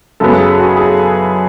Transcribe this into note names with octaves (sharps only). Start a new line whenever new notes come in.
F#2 C#3 F#3 B3 A4
G#4
F#4
G#4